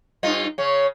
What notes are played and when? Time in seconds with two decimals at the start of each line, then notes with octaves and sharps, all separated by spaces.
0.23 G2 D#4 F4
0.58 C#3 C#4